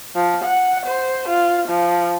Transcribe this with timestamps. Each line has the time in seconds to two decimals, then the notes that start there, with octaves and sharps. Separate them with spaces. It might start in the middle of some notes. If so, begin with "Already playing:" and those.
0.16 F3
0.45 F#5
0.86 C5
1.29 F4
1.69 F3